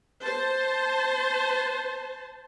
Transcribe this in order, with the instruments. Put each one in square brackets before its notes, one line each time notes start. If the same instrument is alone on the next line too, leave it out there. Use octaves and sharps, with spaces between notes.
[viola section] C5 A5